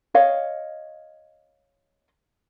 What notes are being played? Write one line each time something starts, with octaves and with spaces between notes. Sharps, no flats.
C#5 D#5 F5